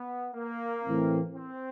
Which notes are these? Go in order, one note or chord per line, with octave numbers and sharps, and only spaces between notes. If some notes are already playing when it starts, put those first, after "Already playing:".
Already playing: B3
A#3
A2 E3 A3 C4
C4